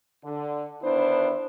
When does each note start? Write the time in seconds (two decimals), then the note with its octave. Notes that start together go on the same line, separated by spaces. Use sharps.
0.24 D3
0.82 D3 D#3 B3 D4 E4 C5